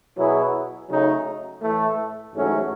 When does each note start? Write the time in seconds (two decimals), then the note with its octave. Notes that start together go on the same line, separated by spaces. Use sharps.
0.16 B2 F#3 B3 E4 G#4
0.89 C#3 F#3 A3 D#4
1.62 A2 E3 A3
2.35 A1 G#2 F#3 A3 C#4